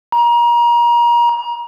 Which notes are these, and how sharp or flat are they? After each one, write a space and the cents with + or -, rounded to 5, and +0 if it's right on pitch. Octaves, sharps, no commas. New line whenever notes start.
A#5 +30